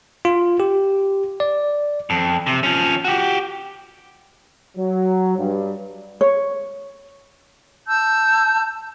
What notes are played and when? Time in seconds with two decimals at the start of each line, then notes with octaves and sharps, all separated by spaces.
0.25 F4
0.60 G4
1.40 D5
2.10 F2
2.47 C3
2.63 F3 C#4
3.04 F#4 G4
4.77 F#3
5.37 G2
6.21 C#5
7.87 A5 E6 G6